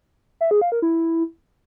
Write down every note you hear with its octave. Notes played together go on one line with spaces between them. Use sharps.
E5
G#4
F5
A#4
E4